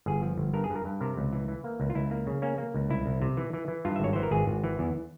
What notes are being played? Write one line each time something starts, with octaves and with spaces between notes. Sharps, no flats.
G1 G#4
F3
G1
G2 A#4
G#4
G2
A#4
G2
C3 A#4
C#2
E3
E3
A#3
C#2
F4
C#2 E4
A#3
C#3
A#3 C#4
A#3
C#2
C2 E4
C2
C3
E3
E3
E3
G2 F4
E5
G#1 C#5
E3 C5
A#4
G#1 G#4
G#1
E3
E2